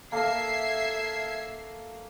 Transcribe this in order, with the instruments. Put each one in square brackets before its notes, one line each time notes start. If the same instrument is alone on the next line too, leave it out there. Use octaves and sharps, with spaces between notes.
[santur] A#3 A4 [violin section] E5 G#6 C7